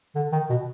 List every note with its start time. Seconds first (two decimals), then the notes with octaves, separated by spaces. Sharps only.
0.15 D3
0.32 D#3
0.50 B2